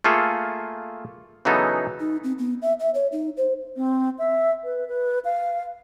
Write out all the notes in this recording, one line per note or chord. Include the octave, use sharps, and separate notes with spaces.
A3 A#3 F4 G#4 A4
C#3 E3 F#3 B3 D#4 A4
D#4
C4
B3
E5
E5
C#5
D#4
C5
C4
E5
B4
B4
F5